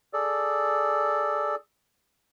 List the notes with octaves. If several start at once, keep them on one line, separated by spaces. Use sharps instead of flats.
G#4 A4 D5